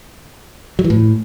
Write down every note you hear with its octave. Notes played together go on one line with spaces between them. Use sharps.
F#3
E3
A2